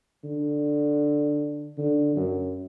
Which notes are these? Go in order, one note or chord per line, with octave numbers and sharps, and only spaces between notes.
D3
D3
F#2